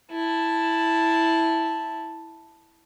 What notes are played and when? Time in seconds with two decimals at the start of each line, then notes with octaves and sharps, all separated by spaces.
0.12 E4 A5